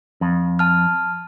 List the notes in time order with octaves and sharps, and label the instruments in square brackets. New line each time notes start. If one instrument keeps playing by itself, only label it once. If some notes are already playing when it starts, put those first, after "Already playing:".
[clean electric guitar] F2
[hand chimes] A5 F6